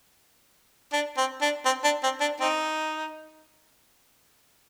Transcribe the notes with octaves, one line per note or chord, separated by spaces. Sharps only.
D4
C4
D4
C4
D4
C4
D4
C4 D#4